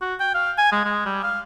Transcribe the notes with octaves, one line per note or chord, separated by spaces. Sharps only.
F#4
G5
F5
G#5
G#3
G#3
G3
F5